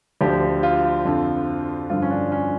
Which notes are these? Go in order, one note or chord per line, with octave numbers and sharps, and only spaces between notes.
D2 D3 F3 G4
F4
F2 D3 F3
G2 D3 F3 F4
C#4
D4
C#4